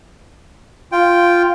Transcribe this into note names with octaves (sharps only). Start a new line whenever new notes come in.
F4 G5